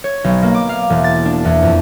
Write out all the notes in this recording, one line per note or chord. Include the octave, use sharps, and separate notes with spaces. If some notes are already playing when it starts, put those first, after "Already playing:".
C#5
B1
A#3
D6
F5
E1
A6
D4
E2
F2